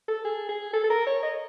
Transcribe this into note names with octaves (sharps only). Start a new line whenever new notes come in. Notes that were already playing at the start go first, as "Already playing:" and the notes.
A4
G#4
G#4
A4
A4
A#4
C#5
D#5